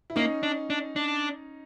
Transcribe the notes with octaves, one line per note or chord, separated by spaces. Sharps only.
E4
A#3 C#4 D#4
D4
D4
D4